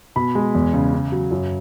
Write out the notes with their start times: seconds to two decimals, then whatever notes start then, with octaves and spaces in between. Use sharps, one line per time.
0.16 B2 B5
0.35 G#3
0.55 E2
0.74 C#3
0.93 C#3
1.12 F#3
1.31 F#2